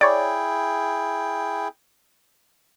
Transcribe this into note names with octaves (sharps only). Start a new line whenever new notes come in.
E4 G#4 C#5 D5 G5